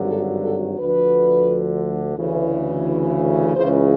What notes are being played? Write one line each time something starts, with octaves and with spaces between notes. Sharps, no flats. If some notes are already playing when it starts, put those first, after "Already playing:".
Already playing: G#1 G2 D3 F#3
A4
A4
D2 D3 F3 B4
D2 C#3 E3
C#2 C#3 E3 C5